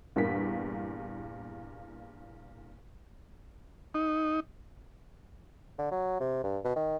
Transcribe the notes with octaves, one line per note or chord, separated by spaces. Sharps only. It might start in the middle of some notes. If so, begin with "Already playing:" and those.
E2 G2 A#2 A#4 B6
D#4
D3
F#3
C3
G2
B2
D#3